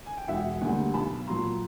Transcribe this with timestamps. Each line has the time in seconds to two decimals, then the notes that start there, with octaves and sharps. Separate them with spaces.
0.06 G#5
0.17 G5
0.28 E1 E5 F#5
0.61 D2 D3 G3 A#3 F#5 G#5
0.94 B1 A5 B5
1.27 A#2 F#3 A#5 C6